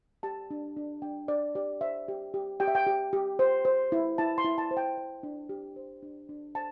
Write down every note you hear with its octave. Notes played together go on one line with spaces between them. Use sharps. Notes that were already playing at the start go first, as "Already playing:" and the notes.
G4 A5
D4
D4
D4 G5
D4 D5
G4 D5
C5 E5
G4
G4
G4 G5
E5
G5
G4
G4
C5
C5
E4
E4 A5
C6
E4
A5
C5
G5
C5
D4
G4
C5
D4
D4
C5 A5